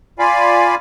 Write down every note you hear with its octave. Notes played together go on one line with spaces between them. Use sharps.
F4 D5 F5 G#5 B5